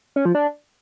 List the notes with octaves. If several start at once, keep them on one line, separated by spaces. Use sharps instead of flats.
C#4
F3
D4